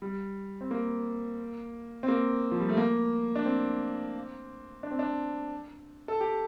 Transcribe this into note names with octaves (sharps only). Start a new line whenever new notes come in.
G3
C4
A#3
C4
A#3
F3
G3
A3
A#3
D4
C4
D4
C4
D4
A4
G4